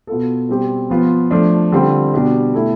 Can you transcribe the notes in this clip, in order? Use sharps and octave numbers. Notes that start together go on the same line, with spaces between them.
B2 B3 F4 A4
B2 G3 C4 G4
F3 B3 F4
F3 A3 D4
D3 G3 C4 F4
B2 G3 D4 G4
B2 A3 E4 A4